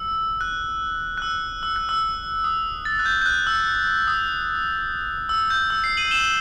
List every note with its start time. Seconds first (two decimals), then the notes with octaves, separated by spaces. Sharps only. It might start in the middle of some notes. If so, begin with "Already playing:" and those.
Already playing: E6
0.41 F#6
1.18 F#6
1.22 E6
1.63 E6
1.76 F#6
1.89 E6
2.44 D#6
2.85 A6
2.99 F#6
3.06 G6
3.21 G6
3.26 F#6
3.47 E6
4.07 D#6
5.29 E6
5.50 G6
5.70 E6
5.84 C7
5.97 D#7 F#7
6.11 E7 G7